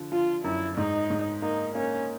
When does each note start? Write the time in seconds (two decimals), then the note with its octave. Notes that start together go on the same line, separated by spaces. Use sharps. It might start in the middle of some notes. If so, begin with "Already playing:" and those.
Already playing: D3 F3
0.12 F3 F4
0.44 F#2 E4
0.77 G#2 D#4
1.10 G#2
1.42 A#3 D#4
1.75 A#3 C#4